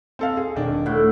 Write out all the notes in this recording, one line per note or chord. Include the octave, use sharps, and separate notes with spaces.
C4 A4 F5
G#4
E1 D#3 D4
A2 F#5